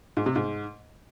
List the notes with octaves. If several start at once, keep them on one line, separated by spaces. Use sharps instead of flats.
G#2
C3
G#2